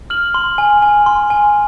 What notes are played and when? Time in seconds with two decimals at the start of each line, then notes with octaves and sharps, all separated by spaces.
0.10 F6 F#7
0.34 C6
0.58 G#5
0.82 G#5
1.06 C6
1.30 G#5